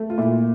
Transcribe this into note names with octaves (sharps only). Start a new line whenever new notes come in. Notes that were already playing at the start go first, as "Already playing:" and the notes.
Already playing: A3
F4
A#2 E4